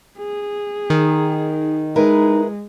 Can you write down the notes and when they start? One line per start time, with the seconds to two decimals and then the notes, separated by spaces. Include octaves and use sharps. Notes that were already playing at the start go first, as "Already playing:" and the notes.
0.18 G#4
0.90 D#3
1.96 G#3 D#4 E4 A#4 B4